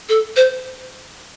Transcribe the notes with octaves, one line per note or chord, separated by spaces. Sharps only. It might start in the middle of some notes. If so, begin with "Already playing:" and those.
A4
C5